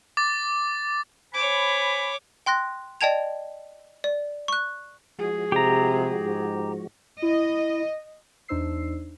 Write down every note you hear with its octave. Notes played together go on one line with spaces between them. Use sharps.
D6 A6
C5 C#5 G#5 B5 D6
G5 C6 F#6 A#6
D5 D#5 G5 A5 G#6 F7
D5
C#6 F#6
F3 G#3 F#4 G#4
C3 G4 A#5
G#2
E4 D#5
E2 D4 D#4 C5 E6 C7